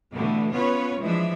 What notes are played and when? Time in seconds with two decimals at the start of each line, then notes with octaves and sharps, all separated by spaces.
0.13 B2 D3 E3 G3 A3
0.53 B3 C#4 F4 B4 C#5
1.01 E3 F3 G#3 D4 E5